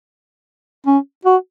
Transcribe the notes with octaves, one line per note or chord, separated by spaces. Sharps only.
C#4
F#4